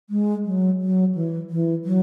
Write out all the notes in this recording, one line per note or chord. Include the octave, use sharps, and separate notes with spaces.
G#3
F#3
F#3
E3
E3
F#3